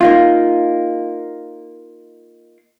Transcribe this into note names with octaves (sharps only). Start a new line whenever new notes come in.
A#3 D#4 F4